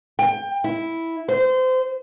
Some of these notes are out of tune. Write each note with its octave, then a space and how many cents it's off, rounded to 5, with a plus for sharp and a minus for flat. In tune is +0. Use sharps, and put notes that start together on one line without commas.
G5 +25
E4 -5
C5 -25